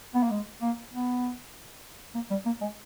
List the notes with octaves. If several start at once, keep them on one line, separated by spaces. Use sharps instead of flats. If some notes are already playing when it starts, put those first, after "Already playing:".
B3
A#3
G#3
A#3
B3
A#3
G3
A#3
G#3